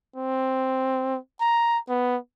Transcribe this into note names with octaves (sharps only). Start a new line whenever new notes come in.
C4
A#5
B3